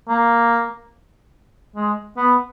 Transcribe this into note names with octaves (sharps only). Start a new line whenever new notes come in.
A#3
G#3
B3